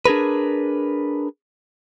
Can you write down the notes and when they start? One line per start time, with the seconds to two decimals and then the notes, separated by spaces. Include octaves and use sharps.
0.05 D4 G#4 A#4 B4